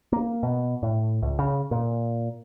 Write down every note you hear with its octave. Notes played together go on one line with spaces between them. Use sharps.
A#3
B2
A2
C#2
C#3
A#2